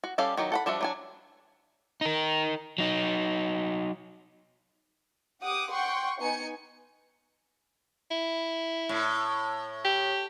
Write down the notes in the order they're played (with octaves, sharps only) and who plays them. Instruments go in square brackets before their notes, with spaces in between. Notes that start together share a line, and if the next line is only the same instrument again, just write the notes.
[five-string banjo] F#4
G3 C#4 G4 A4 F5
D#3 F#3 G4
A4 F#5 B5
F3 G3 D4 F#4 E5
F#3 D4 G#5
[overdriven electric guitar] D#4 A#4
F#3 D#4
[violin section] G4 F#5 D6 D#6
F#5 G5 C6 C#6
B3 D#4 G#5 C#7
[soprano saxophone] E4
[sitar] A2
[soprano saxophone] G4